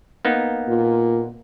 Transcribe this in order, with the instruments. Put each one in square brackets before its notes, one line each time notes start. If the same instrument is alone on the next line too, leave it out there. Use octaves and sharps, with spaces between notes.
[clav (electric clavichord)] A#3 B3 D#4
[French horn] A#2